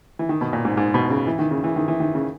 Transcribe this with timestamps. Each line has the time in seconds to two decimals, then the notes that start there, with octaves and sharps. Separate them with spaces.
0.19 E3
0.29 D#3
0.41 B2
0.53 A#2
0.65 G#2
0.77 G#2
0.94 B2
1.10 C#3
1.27 E3
1.39 D#3
1.51 C#3
1.64 E3
1.76 D#3
1.88 E3
2.00 D#3
2.15 C#3